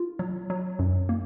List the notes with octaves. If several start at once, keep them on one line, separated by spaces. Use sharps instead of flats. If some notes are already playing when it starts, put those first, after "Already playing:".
Already playing: F4
F#3
F#3
F#2
A#3